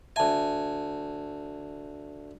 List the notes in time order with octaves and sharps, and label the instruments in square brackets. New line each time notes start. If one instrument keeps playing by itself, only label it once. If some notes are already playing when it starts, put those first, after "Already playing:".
[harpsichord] D2 G#5 [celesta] E5 A5